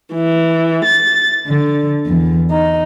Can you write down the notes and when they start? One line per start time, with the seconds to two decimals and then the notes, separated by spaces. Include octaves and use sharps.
0.13 E3
0.85 A6
1.45 D3
2.06 E2
2.49 D#4